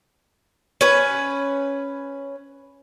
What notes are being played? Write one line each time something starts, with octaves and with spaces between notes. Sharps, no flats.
C#4 B4